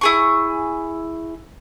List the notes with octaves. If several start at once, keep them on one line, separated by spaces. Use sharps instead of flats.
E4 G#4 C#6